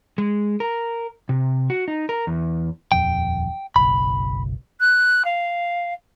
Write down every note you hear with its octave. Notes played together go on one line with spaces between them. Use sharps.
G#3
A#4
C3
F#4
D#4
A#4
E2
D#1 F2 G5
F#1 B1 B5
F#6
F5